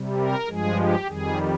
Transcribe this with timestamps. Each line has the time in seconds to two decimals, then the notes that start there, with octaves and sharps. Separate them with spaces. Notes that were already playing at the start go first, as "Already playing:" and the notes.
Already playing: C3 G3
0.18 A#4
0.46 G2 F3 G#3 G#4
0.76 G4
1.07 F2 D#3 G3 G#4